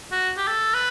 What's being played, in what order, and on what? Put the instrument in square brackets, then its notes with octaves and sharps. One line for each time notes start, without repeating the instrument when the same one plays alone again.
[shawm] F#4
G4
A4
B4